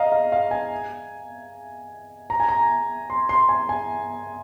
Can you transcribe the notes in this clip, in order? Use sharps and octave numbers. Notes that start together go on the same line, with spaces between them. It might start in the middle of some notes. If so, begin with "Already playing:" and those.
Already playing: D#5 F5 A#5
F5
F5
G#5
A#5
G#5
A#5
C6
C6
G#5
G#5